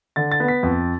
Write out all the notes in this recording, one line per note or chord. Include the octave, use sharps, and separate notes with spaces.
D3 A6
A6
B3
B6
F2